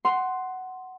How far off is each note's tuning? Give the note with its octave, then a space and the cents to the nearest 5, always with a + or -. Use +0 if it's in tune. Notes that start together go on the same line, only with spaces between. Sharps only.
F#5 +10 C6 +0